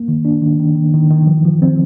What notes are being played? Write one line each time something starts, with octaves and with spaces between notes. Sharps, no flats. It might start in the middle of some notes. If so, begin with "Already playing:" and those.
Already playing: A#3
D#3
D4
D#3
D#3
D#3
D#3
D#3
F3
F3
C4